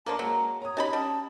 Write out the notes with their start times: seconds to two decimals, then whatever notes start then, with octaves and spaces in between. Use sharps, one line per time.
0.06 D3 F3 A#3 D5 A5
0.19 F#3 G#3 A#3 A#5
0.62 C#5 A#5 D#6
0.77 C#4 D#4 G4 A5 B5
0.93 G3 A5